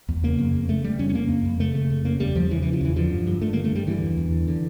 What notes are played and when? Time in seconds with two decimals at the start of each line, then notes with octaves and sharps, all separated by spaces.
0.09 E2
0.23 C#3 A#3
0.39 F2
0.54 F2
0.69 C#3 A3
0.84 C#3 G3
0.99 F2 C#4
1.09 C#4
1.14 C#3 A#3
1.30 F2
1.45 F2
1.60 C#3 A3
1.75 C#3
1.90 F2
2.05 C#3 A#3
2.20 E2 G3
2.35 E2 F3
2.50 C#3 E3
2.62 C#3 E3
2.73 F3
2.81 E2 E3
2.96 D3 F3
3.11 G2
3.26 G2
3.41 D3 A3
3.53 D3 A#3
3.64 A3
3.72 G2 G3
3.87 D3 E3
4.02 E2
4.17 E2
4.32 D3
4.47 D3